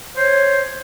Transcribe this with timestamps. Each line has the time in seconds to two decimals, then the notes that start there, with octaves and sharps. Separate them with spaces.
0.16 C5 C#5